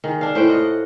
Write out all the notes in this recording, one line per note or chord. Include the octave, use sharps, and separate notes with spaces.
D#3 G#4
D4 F5
A2 C5 F#5 G5
F4 D#5 F#5